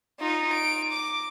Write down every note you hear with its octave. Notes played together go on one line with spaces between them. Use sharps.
D#4 F4
D7
D6